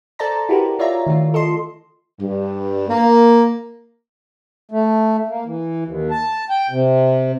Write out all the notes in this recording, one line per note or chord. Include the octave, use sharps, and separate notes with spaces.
A4 C5 D5 A5 A#5
E4 F#4 G4 A#4 B4
F4 C#5 D5 E5 A#5
D#3 A3 F4
A4 D#5 C6
G2
A#3
A3
A#3
E3
D#2
A5
G5
C3